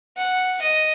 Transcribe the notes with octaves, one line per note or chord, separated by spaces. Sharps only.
F#5
D#5